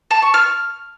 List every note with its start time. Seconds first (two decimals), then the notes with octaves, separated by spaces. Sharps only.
0.11 A5
0.22 C#6
0.34 F6